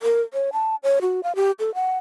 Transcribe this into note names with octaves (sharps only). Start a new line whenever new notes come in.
A#4
C#5
A5
C#5
F#4
F5
G4
A4
F#5